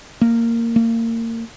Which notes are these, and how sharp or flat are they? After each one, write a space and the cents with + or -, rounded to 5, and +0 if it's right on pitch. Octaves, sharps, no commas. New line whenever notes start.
A#3 -15
A#3 -30